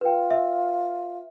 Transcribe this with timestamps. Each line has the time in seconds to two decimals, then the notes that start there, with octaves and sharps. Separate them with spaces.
0.01 F4 B4 G5
0.31 E5